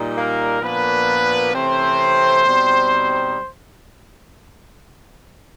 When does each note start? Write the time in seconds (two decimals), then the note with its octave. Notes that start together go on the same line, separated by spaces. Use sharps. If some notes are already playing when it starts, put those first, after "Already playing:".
Already playing: A#2 G3 D#4
0.16 A#3 A#4
0.61 A#2 F3 A#3 B3 D4 B4
1.54 C3 E3 A3 C4 C#4 C5
2.46 B2 G3 C4 D#4